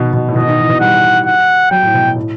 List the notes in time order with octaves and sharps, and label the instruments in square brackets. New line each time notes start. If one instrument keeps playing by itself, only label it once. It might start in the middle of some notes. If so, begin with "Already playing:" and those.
Already playing: [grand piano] B2 D#3
B2
A2
[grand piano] B2 [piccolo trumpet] D#5
[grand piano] D#3
E3
B2
[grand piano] G3 [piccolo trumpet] F#5
[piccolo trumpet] F#5
[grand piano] F#3 [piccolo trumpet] G5
[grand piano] A2
B2
A2